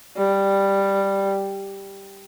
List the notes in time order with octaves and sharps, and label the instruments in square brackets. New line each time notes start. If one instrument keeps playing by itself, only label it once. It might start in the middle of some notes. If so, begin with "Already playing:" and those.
[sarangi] G3